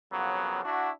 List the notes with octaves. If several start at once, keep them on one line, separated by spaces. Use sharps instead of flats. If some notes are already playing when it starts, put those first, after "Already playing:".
F2 C#3 F#3 A#3 B3
D4 E4 F#4